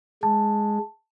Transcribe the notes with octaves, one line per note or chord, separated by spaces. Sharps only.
G#3 A5